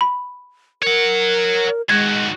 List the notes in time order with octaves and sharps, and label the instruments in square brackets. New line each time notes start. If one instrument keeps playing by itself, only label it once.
[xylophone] B5
[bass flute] A#4 [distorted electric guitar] C#5 F#5
[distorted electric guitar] D#3 F#4 [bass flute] G#3 [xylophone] G#6